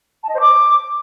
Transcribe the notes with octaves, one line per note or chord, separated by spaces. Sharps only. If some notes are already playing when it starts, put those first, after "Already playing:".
A5
D#5
C5
D6